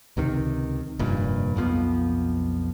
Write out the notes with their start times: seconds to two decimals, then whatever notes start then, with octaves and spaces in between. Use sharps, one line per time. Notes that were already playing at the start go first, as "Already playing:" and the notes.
0.17 C#2 C3 D#3
0.99 F1 G2 A#2
1.55 B1 F2 F3 B3